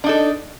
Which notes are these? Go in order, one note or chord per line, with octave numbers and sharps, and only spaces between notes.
D4 D#4 A4